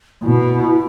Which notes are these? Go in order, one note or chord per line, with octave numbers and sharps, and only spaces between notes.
B2 E4